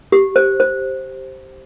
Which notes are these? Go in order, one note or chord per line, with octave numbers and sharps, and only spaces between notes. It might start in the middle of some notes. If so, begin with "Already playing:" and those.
G4
C5
C5